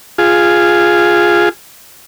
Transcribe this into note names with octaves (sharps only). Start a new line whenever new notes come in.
F4 G#4